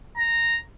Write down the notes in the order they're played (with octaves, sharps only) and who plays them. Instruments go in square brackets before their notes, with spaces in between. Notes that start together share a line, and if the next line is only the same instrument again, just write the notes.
[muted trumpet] A#5